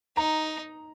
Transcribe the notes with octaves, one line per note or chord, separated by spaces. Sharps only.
D#4 A#5